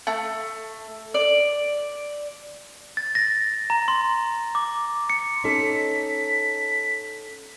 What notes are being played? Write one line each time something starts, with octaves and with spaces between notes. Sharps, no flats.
A3
D5
A6
A#6
A#5
C6
D6
C#7
C#4 D#4 A4 B6